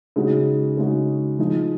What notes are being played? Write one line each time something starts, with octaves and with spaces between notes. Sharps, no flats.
C#3 G#3 D#4 F#4
C#3 G#3 D#4 F#4
F3 G#3 D#4